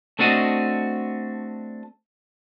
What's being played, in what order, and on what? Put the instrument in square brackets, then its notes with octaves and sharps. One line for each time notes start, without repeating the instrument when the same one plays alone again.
[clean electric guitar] A3 C4 D4 F#4 D#5